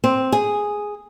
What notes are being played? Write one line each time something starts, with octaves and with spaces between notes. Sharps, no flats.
C4
G#4